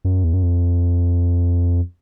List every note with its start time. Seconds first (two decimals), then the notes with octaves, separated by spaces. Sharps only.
0.05 F#2
0.24 E2
0.34 F#2
0.43 F2